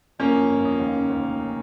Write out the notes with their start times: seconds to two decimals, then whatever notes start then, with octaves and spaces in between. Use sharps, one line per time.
0.19 F2 A#3 C#4
0.35 F2
0.49 G1
0.65 F2
0.80 D#2
0.95 C#3
1.10 D#2
1.24 F1